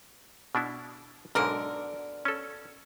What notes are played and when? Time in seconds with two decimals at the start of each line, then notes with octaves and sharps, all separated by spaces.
0.55 B2 D4 E4
1.35 B1 G#2 B2 D3 A#4
2.25 C#4 A4